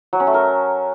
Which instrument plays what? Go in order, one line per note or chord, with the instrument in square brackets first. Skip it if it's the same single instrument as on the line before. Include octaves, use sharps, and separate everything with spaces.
[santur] F#3
C#4
A3
A#4